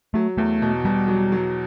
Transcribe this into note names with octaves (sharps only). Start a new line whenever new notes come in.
F#3 A3
E2 A3
B2
B2 G3
F#3
F#3